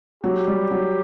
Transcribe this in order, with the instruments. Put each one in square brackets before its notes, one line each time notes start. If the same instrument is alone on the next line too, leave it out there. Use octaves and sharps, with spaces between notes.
[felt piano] F#3 [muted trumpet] G4
[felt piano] G3
F#3